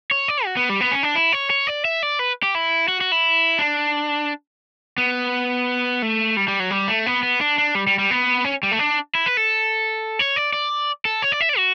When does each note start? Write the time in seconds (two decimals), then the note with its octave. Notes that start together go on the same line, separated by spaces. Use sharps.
0.11 C#5
0.28 D5
0.45 F#4
0.57 B3
0.69 G3
0.81 B3
0.91 C#4
1.03 D4
1.15 E4
1.33 C#5
1.50 C#5
1.67 D5
1.85 E5
2.03 D5
2.19 B4
2.43 G4
2.55 E4
2.88 F#4
3.01 F#4
3.12 E4
3.59 D4
4.98 B3
6.02 A3
6.37 G3
6.48 G3
6.60 F#3
6.71 G3
6.88 A3
7.06 B3
7.23 B3
7.41 D4
7.58 D4
7.75 G3
7.87 G3
7.99 G3
8.11 B3
8.44 C#4
8.63 G3
8.72 A3
8.79 D4
9.15 E4
9.26 B4
9.37 A4
10.19 C#5
10.36 D5
10.53 D5
11.05 A4
11.22 C#5
11.32 D5
11.41 E5
11.49 D5
11.57 F#4